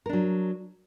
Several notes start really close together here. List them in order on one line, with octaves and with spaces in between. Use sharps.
A#4 D4 F#3